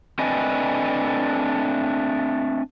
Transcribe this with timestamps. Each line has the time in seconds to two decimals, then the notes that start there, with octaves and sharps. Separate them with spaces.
0.19 A3 C4 D4 B4 D#5 G#5